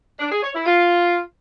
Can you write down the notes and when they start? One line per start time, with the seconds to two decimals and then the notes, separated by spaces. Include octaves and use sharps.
0.19 D4
0.31 G#4
0.42 C#5
0.54 E4
0.66 F4